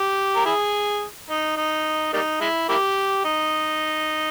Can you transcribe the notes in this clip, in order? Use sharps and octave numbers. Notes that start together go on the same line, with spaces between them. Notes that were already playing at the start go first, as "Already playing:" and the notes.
Already playing: G4
A#4
E4 G#4
D#4
D#4
G3 A#3 D#4
G#3 E4
A#3 E4 G4
D#4